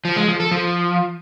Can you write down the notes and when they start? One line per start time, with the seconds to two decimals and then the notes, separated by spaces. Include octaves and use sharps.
0.05 F3
0.16 G#3
0.28 F3
0.40 A4
0.52 F3